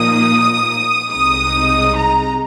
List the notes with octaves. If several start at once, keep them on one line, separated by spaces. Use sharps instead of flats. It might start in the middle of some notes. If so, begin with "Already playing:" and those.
Already playing: A#2 F3 A#3 D#4 D#6
C2 C3 G#3 D#4 D#6
A#5